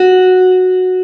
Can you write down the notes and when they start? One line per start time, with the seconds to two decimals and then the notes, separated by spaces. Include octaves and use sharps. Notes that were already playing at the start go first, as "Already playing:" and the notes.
Already playing: F#4